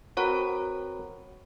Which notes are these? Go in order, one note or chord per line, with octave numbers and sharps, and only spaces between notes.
C4 F#4 A#4 B4 C#5 A#5